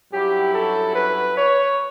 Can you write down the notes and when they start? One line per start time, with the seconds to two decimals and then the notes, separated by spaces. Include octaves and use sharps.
0.12 G2 F#3 C#4 E4 G4
0.54 A4
0.95 B4
1.36 C#5